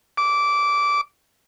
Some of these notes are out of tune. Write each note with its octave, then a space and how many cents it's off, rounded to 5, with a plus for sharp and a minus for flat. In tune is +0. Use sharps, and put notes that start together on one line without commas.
D6 -15